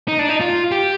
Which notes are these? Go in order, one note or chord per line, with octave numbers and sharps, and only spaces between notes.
D#4
D4
D#4
F4
G4